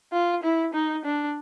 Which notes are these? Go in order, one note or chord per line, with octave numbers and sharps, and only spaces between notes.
F4
E4
D#4
D4